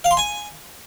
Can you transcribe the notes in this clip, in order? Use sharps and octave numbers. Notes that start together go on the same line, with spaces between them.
F5
C6
G#5